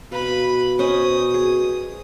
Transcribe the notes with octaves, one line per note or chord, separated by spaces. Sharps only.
B2 B4 F5 B5
C#4 C5 D#5 D#6
G#4